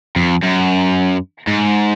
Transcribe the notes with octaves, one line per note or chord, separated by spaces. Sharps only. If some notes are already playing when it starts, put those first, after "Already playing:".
F2
F#2
G#2